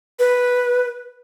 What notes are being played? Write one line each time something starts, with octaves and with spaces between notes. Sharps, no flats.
B4